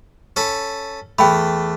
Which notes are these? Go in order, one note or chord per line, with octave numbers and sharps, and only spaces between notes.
C#4 A4 B5
E2 A3 G5 B5